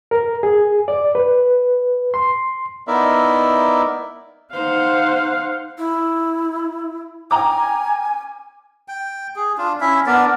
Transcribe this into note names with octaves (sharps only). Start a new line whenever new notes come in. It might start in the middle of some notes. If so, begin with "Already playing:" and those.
A#4
G#4
D5
B4
C6
B3 D#4 E4 A#4 D5 E5
D#4 C5 F5 F#5
E4
G5 G#5 A#5 D6
G5
G#4
D4 F4
C#4 E4 E5
B3 D4 A#4 D5